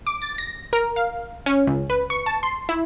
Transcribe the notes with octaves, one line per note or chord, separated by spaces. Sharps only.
D6
A6
A#6
A#4
F5
C#4
C#2
B4
C#6
A5
C6
E4